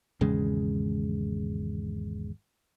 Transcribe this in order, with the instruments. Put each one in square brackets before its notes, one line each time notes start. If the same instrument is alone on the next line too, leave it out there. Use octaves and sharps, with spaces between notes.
[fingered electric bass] G#1 E2 C#3 G#3